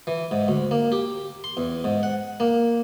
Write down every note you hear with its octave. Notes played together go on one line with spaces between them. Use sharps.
E3
G#2
D2
A#3
G4
C6
E2
G#2
F#5
A#3